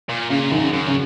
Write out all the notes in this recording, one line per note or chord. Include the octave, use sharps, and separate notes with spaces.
A#2
A#2 C#3
F#2 D#3
C#3
F#2
C#3